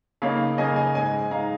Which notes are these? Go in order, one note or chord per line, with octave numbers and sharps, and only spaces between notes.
C#3 A#3 D#4 C#5 F5
C#3 A#3 D#4 D#5 G#5
D#5 G#5
G#2 G#3 D#4 D#5 G#5
G#3 D#4 F5 A#5